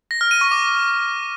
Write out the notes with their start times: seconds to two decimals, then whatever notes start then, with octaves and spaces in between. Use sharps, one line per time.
0.11 A#6
0.21 F6
0.31 D#7
0.41 C#6
0.51 D6